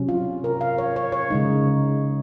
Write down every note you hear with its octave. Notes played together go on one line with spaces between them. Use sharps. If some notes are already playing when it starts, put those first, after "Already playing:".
Already playing: C3 F#3 C#4
F4
A#4
F5
C#5
C#5
C#5
C#3 G#3 D#4